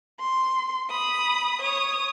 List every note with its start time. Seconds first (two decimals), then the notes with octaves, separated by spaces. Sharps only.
0.20 C6
0.91 B5 D#6
1.61 C#5 D#6